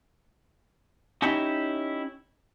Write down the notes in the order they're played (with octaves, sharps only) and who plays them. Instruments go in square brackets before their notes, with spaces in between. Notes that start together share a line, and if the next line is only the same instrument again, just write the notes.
[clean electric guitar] C#4 D#4 E4 G4 C#5